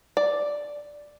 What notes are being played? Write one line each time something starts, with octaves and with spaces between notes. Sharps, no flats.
D5